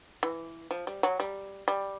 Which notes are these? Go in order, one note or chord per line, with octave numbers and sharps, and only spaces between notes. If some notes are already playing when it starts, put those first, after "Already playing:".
E3
F3
G3
F#3
G3
G3